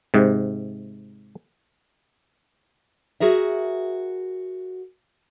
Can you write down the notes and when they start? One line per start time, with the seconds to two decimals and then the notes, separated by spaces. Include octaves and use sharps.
0.14 G#2 C3
3.20 F#4 G#4 A#4 E5